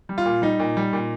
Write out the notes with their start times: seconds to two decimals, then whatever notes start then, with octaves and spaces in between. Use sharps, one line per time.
0.09 G3
0.18 F4
0.25 A#2
0.42 G3 D#4
0.60 A#2
0.77 G3
0.93 A#2